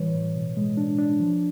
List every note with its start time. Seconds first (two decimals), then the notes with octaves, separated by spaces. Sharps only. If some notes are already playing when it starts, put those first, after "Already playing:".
Already playing: A2 E3 G3 B4 C#5
0.14 A2
0.36 B2
0.57 G#3
0.77 D4
0.98 D4
1.19 F3